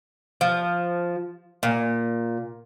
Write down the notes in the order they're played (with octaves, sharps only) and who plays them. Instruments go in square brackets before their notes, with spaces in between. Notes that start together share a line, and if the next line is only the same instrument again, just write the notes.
[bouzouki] F3
A#2